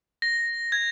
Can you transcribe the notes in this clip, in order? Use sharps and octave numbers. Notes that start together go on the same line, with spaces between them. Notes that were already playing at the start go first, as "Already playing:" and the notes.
A#6
G#6